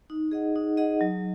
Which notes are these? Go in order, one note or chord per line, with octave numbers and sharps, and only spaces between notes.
D#4
G#4 D#5 F#5
D#4
G#4 D#5 F#5
F#3